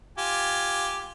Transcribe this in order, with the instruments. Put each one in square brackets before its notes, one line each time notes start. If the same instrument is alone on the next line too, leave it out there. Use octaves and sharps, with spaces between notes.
[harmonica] F4 G4 G#5